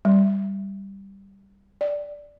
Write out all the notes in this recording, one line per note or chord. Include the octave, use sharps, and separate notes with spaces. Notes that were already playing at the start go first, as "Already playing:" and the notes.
G3
D5